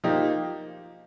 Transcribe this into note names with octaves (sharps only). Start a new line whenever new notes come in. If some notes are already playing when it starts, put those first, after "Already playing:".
F3 A#3 D#4 G4